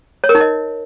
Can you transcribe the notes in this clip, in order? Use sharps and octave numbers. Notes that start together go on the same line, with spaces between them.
C#5
A#4
D#4
D#5